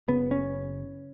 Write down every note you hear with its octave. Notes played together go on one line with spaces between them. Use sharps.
F#1 E2 C#3 B3
C#4